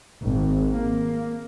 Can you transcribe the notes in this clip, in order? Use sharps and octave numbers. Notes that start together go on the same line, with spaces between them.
G#1
A#3